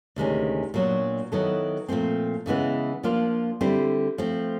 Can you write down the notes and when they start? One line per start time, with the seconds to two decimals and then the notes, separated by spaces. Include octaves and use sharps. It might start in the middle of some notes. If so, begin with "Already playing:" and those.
0.16 D2 C3 D#3 G#3 C#4
0.74 A#2 F#3 B3 D4
1.32 D#3 F#3 B3 E4 A4
1.88 A#2 F3 A3 C4
2.46 C#3 E3 G#3 B3 E4
3.03 F3 A#3 D4 F4
3.61 D3 G3 C4 E4
4.18 F3 A3 C4